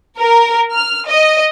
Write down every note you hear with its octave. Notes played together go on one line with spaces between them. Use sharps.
A#4
F6
D#5